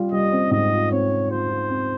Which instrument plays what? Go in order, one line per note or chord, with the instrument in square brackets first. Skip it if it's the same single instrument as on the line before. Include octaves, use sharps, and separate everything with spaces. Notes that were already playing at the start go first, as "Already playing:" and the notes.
Already playing: [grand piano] G3 F4
[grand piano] G3 [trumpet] D#5
[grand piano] C4
[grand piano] G#2 [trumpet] D#5
[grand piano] F4
[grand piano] C4 [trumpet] C#5
[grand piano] C4
[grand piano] F4 [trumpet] C5
[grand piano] F4
C4